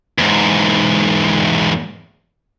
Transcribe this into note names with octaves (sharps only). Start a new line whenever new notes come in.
E2 G#2